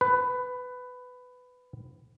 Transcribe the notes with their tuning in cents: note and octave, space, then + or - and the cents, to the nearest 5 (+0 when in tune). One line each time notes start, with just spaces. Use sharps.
B4 +15